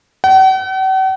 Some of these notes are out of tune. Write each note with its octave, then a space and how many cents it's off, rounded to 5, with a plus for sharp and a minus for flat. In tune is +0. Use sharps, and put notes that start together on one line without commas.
F#5 +45